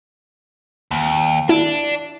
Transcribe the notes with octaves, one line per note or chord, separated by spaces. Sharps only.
D#2
D4 E4